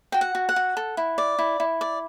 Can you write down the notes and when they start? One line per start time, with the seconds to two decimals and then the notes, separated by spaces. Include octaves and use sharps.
0.12 F#4 G5
0.21 F#5
0.35 F#4
0.49 F#5
0.56 F#4
0.77 A4
0.97 E4
1.18 D5
1.39 E4
1.60 E4
1.81 D5